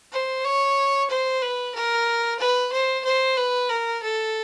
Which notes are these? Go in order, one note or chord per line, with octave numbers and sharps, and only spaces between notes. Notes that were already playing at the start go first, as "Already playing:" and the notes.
C5
C#5
C5
B4
A#4
B4
C5
C5
B4
A#4
A4